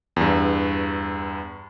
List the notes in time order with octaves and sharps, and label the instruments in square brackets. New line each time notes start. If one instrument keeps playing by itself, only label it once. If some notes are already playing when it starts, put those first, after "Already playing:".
[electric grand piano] E2 G2